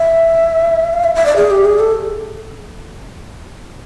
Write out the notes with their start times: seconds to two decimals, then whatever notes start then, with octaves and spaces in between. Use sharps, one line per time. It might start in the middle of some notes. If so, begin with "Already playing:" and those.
Already playing: E5
0.94 F5
1.04 E5
1.15 E5
1.26 D5
1.36 G#4
1.51 G4
1.65 G#4
1.79 A4